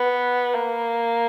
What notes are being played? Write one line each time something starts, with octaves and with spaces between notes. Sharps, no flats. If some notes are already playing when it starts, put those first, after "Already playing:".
Already playing: B3
A#3